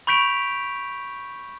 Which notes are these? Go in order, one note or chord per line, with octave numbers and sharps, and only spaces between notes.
B5 C#6 G6 B6 D7 F7